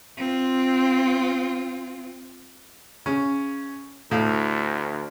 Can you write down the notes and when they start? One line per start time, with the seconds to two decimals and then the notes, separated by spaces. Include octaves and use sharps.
0.18 C4 F4
3.06 C#3 C#4
4.11 D2 A2 F5